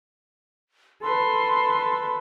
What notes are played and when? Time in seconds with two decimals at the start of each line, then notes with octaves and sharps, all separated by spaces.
1.03 A4 B4 C6